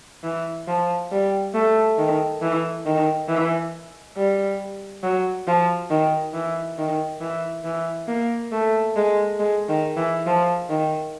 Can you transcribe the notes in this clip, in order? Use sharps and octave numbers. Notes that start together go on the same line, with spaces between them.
E3
F3
G3
A3
D#3
E3
D#3
E3
G3
F#3
F3
D#3
E3
D#3
E3
E3
A#3
A3
G#3
G#3
D#3
E3
F3
D#3